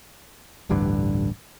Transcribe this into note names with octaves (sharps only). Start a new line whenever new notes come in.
D1 A1 G2 D3